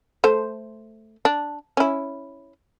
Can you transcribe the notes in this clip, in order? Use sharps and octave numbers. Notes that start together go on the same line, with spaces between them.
A3 C5
D4
C#4 E4